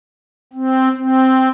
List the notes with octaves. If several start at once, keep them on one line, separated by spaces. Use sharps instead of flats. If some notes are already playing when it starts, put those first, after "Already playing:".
C4
C4